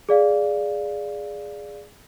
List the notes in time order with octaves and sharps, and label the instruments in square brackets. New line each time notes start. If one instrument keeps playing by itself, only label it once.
[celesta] G#4 D5 F5